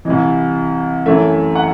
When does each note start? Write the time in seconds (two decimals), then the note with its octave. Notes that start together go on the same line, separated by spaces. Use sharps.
0.05 C2 C3 E3 D#5
1.06 F#2 E3 A3 E5
1.55 F#5